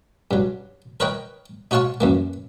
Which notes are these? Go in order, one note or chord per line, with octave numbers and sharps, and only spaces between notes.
G2 F#3
A#4 B4 C#5 D#5 G5
D#4 F#4 C#5 F5 A5 C#6
F#2 E3 A#3